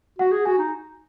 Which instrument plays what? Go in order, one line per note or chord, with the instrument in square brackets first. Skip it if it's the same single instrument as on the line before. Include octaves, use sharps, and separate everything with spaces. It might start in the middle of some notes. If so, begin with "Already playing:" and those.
[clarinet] F#4 [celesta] F#5
[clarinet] G#4
[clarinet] F#4 [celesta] G#5
[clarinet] D#4